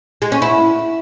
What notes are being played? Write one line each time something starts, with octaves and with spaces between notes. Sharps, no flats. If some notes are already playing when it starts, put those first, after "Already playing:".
G#3
C#4
E4